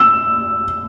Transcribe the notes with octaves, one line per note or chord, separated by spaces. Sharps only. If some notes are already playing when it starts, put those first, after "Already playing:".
Already playing: E6